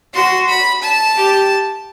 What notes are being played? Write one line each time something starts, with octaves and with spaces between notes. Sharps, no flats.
F#4 C6
B5
A5
G4